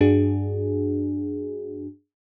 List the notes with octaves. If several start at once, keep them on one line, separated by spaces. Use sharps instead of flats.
G2 D4 F#4 G#4